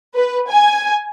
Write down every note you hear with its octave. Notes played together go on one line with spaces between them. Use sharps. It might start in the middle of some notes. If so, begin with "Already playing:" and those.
B4
G#5